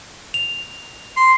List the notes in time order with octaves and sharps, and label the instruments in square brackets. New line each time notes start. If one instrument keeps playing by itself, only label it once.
[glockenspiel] F7
[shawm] C6